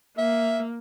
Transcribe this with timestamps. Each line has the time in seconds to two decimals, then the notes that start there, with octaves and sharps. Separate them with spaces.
0.18 A#3 E5